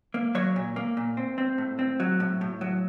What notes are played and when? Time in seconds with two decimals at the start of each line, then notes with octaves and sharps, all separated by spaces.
0.14 A#3
0.35 F#3 C#5
0.56 A#2
0.76 A#3
0.97 A#2
1.17 C4
1.38 C4
1.58 A2
1.79 C4
2.00 F#3
2.20 A2
2.41 A2
2.61 F#3